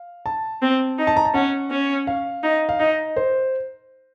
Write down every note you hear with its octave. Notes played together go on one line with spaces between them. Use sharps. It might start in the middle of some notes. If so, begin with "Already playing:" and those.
Already playing: F5
A5
C4
D#4
A5
A#5
A5
C#4 F#5
C#4
F5
D#4
F5
D#4 D#5
C5